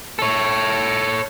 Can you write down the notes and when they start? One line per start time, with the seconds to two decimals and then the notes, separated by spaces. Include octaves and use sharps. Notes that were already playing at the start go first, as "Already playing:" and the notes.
0.19 A4 C#5